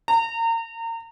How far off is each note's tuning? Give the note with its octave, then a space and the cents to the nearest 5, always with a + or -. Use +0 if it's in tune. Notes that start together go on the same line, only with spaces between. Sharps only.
A#5 -30